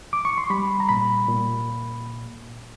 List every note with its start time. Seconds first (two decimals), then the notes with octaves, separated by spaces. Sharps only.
0.13 D6
0.25 C#6
0.38 C6
0.50 G3 B5
0.80 A#5
0.89 A#2 B5
1.28 A#2